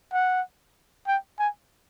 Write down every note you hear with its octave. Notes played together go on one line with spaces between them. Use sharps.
F#5
G5
G#5